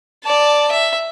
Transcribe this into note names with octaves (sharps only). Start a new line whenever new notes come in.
D5 A5
E5